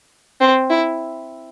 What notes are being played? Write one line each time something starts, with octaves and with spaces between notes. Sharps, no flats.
C4
E4